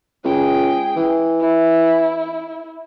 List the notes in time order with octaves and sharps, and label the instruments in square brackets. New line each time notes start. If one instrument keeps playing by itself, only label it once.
[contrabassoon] C#2 [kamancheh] G#4 G5
[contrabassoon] E3
[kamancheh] E4